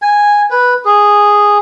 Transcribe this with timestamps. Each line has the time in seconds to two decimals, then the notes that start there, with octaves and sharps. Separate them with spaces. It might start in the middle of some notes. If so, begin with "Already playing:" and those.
0.02 G#5
0.50 B4
0.85 G#4